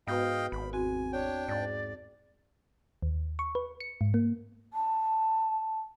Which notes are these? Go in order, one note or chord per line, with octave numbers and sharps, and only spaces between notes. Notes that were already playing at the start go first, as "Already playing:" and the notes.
G#2 B3 F#4 B4 D#5 F5 G5
G#1 B5
E2 C4 F#4 G#5
D4 C#5 G5
G#2 D5
D#2
C#6
B4
C#7
G#2
A#3
A5